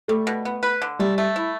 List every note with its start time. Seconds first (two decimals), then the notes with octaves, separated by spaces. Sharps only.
0.08 G3 A3
0.27 B2
0.45 B3
0.63 B4
0.82 D3
0.99 G3 A3
1.18 A3
1.36 E4